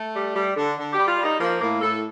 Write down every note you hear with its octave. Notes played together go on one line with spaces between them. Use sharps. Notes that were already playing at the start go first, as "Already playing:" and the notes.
Already playing: A3
G3
G3
D3
D3
G4
G3
F4
G3
D#4
F3 A#3
A2 A#3
A2 A4